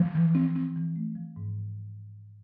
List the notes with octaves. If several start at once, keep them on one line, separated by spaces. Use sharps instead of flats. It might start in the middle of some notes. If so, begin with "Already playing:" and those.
Already playing: F3
E3
C4
C4
E3
A3
F3
G#2